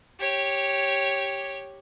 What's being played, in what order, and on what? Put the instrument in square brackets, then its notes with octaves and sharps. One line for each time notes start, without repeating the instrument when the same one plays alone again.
[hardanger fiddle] G4 C#5